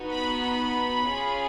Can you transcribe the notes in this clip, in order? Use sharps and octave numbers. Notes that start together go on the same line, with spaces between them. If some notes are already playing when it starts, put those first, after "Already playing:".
Already playing: B3 D#4 F#4
B5
B5
C#4 F4 G#4